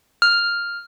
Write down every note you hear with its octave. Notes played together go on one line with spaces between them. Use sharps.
F6